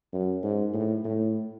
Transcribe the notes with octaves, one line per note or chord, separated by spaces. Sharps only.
F#2
G#2
A2
A2